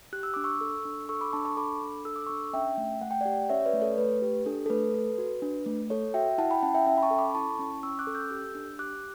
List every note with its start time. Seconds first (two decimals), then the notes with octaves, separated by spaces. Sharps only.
0.13 G4 F#6
0.23 E6
0.34 D4 D6
0.44 C#6 E6
0.61 A4
0.85 D4
1.09 A4 C#6 E6
1.21 B5 D6
1.33 D4 A5 C#6
1.45 A5 C#6
1.57 A4 B5 D6
1.81 D4
2.05 A4 E6
2.16 D6
2.27 D4 C#6 E6
2.53 C#4 E5 G5
2.77 A3
3.01 A3 F#5
3.11 G5
3.21 G4 D5 F#5
3.50 C#4 C#5 E5
3.61 C#5
3.66 B4 D5
3.74 A3
3.82 A4 C#5
3.98 A3 B4
4.22 G4
4.46 D4 A4
4.66 A4
4.70 A3 B4
4.94 A4
5.18 F#4
5.42 D4
5.66 A3
5.90 A4 C#5
6.14 F#4 E5 G5
6.38 E4 F#5 A5
6.51 G5 B5
6.63 C#4 F#5 A5
6.74 E5 G5
6.86 C#4 E5 G5
6.98 B5
7.03 A5 C#6
7.11 A4
7.18 B5 D6
7.30 B5
7.35 E4 A5 C#6
7.59 C#4
7.83 C#4 C#6 E6
7.99 D6 F#6
8.07 A4
8.15 E6 G6
8.31 G4
8.55 D4
8.79 G4 D6 F#6